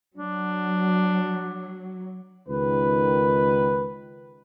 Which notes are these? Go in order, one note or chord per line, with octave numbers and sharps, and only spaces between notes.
F#3 D4
C#2 D#3 B4